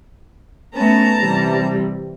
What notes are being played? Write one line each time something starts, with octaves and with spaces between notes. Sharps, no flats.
A3 B3 C#4 A5 A#5
C3 E3 G3